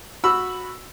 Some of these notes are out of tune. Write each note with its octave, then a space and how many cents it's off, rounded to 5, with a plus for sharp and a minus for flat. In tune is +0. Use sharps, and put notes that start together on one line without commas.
F#4 -15 B5 +0 E6 +0